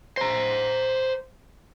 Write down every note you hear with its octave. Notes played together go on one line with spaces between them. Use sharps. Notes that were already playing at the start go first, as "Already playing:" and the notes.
C5 A#5